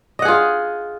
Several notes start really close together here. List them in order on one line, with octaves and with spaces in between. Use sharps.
D#5 F#5 G#4 F4